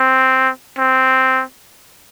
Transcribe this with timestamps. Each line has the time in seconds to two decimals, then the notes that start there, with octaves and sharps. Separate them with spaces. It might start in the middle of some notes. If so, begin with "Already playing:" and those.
Already playing: C4
0.78 C4